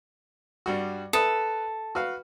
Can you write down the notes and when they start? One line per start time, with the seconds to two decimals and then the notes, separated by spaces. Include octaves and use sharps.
0.66 G2 G3 F#4
1.13 A4 B4 E5 D#6
1.95 F#4 B4 F5